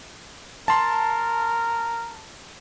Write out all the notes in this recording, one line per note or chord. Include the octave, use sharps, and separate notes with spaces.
A#4 A5 C6